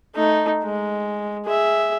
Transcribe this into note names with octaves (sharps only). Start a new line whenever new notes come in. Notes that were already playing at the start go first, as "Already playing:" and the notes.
A3 D#4
G#3
G#4 E5